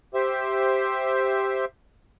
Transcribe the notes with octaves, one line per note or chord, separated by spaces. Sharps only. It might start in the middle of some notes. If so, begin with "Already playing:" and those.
G4 C5 E5